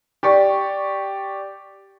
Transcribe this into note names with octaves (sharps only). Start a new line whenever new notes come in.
G4 D5 C#6